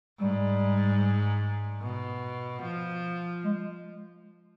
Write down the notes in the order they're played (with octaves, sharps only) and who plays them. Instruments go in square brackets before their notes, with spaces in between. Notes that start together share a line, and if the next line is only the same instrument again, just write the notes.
[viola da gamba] G#2 [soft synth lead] G3
[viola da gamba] B2
F3
[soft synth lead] G#3